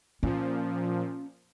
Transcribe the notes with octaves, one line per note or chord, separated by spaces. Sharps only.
A#2 F3 C#4